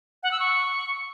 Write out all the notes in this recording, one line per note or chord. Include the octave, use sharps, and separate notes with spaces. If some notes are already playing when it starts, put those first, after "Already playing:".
F#5
E6
C#6